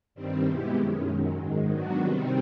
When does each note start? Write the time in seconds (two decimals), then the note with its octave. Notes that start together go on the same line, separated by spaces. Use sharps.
0.15 G2 D#3 G3 C4
0.46 B2 G#3 B3 E4 G4
0.76 F#2 D#3 G#3 C#4
1.07 F#2 D#3 F#3
1.37 G#2 D#3 G#3
1.69 D#3 F#3 B3 D4 F#4
1.99 C3 D#3 G3 C4